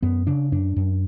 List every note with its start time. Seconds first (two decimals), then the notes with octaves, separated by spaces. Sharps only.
0.02 F#2 B3
0.27 C#3 D4
0.52 F#2 D4
0.76 F#2